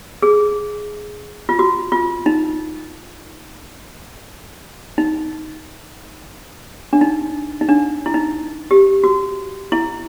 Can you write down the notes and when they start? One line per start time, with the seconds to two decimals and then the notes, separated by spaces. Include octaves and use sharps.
0.22 G#4
1.49 F4
1.59 F#4
1.92 F4
2.26 D#4
4.98 D#4
6.93 D4
7.01 D#4
7.61 D#4
7.69 D4
8.06 E4
8.14 D#4
8.71 G4
9.04 F#4
9.72 E4